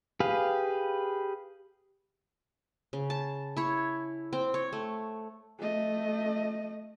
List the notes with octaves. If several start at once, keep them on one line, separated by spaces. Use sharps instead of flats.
G4 G#4 B4 F5
C#3
A5
E4 C#5
C4 G5
C#5
A3
A3 D#5